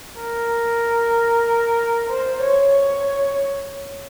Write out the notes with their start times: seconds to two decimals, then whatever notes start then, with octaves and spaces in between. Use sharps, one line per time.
0.20 A#4
2.11 C5
2.41 C#5
2.73 C#5